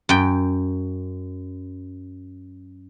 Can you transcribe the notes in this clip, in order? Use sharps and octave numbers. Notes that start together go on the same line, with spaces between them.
F#2 G5